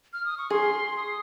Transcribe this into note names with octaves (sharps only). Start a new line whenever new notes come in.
F6
D#6
C#6
G#4 C6
D#6